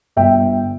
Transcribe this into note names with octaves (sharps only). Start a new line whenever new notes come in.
G1 E5 G5